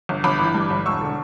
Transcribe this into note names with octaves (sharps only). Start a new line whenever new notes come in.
G1
G1 B5 D6
E3
G2
G1
E1 C#6 E6
D3